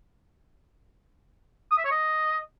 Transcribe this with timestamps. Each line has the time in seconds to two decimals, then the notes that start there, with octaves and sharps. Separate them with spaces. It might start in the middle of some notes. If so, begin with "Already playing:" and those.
1.71 D#6
1.78 E5
1.85 C#5
1.91 D#5